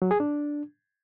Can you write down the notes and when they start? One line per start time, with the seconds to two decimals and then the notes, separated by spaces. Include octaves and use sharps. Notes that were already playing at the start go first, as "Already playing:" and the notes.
0.02 F#3
0.11 G#4
0.20 D4